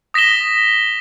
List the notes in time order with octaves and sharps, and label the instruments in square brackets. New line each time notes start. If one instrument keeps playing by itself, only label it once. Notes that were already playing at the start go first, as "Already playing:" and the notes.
[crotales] D#6 A#6 B6 E7 G7